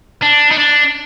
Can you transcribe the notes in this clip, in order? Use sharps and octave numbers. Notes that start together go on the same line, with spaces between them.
D4
D#4
D4